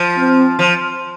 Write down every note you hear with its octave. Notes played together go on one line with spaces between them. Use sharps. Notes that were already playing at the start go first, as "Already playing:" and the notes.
Already playing: F3
C4
F3